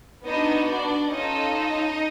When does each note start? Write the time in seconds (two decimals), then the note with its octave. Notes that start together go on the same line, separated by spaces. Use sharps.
0.25 B3 D4 D#4 F#4 D#5
0.68 D4 D5
1.11 C#4 D#4 F4 A4 D#5